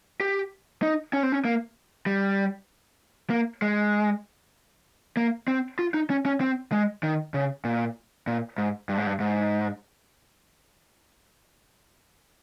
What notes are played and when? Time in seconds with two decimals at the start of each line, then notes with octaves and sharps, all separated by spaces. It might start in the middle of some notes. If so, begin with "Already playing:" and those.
0.20 G4
0.82 D#4
1.13 C#4
1.23 C4
1.32 C#4
1.45 A#3
2.06 G3
3.30 A#3
3.62 G#3
5.17 A#3
5.48 C4
5.79 F4
5.94 D#4
6.10 C#4
6.26 C#4
6.41 C4
6.72 G#3
7.03 D#3
7.34 C#3
7.65 A#2
8.27 A#2
8.58 G#2
8.89 G2
8.98 G#2
9.07 G2
9.20 G#2